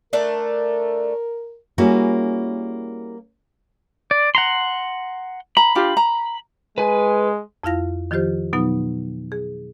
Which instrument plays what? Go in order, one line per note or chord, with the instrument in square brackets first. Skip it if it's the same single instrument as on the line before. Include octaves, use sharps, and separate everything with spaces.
[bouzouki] A3 D4 D5 [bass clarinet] A#4
[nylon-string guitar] G3 A#3 C#4 E4 F#4 G#4
[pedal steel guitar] D5
F#5 A#5 C6
[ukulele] A#5 [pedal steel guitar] B5
[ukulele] D4 F4 G4
A#5
[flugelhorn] G#3 [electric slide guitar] B4 G#5
[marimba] F2 E4 F4 F5 A#6
D#3 F3 F4 G4 C5
B2 F#3 B3 D#4
G#4